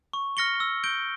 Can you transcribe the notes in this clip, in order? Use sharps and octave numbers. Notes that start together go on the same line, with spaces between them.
C#6
F6 A#6 C#7 G7
E6
G6 D7 G7